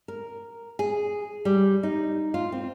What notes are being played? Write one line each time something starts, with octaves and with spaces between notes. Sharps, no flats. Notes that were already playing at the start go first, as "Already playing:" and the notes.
A#4
G#4
G3
D#4
F4
C4